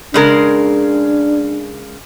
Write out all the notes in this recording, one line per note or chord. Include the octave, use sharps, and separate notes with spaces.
C#3 G#3 D4 A#4